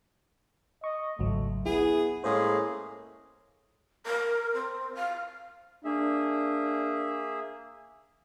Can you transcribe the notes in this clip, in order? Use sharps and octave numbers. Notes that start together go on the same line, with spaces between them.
D#5 C#6
G#1 C#2 F#3 A3
B3 E4 G#4
A2 G#3 A#3 C#4 G#4 C5
A#4
C4
F5
A#3 D4 G#4 E5